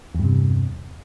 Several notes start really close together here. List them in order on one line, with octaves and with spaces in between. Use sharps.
E2 G2 C3